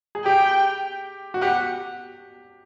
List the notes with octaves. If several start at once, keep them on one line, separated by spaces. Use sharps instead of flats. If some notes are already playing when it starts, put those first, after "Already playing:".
G#4
G4 G5
F#4
G4 F#5